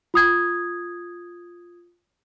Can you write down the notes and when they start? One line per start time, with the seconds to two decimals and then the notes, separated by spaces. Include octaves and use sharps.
0.14 F4 D#6 G#6